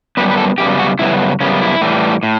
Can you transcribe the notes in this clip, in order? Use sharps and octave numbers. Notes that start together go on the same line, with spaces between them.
F#2 C#3 G3 B3 B4
B4
A4
F#2 C#3 G3 B3 G4
F#4
F#2 C#3 G3 B3 E4
F#2 C#3 G3 B3 C#4
E4
A2 E3 G3
A2